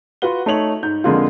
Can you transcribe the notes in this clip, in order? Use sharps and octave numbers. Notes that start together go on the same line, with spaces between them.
F4 F#4 B4 F#5 G7
A3 D#4 C#5 F7 F#7
G#2 G6
F2 D3 G#3 A#3 F4